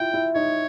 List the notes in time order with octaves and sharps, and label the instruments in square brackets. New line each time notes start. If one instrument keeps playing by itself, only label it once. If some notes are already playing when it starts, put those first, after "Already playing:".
Already playing: [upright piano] E4 F4 [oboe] G5
[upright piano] E4
[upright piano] D#4 [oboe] C#5